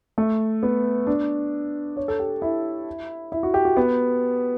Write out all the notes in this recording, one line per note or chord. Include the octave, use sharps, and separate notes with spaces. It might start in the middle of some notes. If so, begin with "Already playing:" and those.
A3
B3
D4
C#5
A4
G4
E4
E4
F#4
G4
F#4
B3